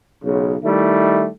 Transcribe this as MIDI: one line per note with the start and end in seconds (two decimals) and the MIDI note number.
0.23 0.55 35
0.23 0.55 49
0.63 1.26 51
0.63 1.26 55
0.63 1.26 57
0.63 1.26 64